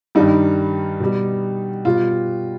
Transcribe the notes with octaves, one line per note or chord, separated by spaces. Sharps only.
G2 D#3 G3 D#4
B2 G3
B2 G3 F4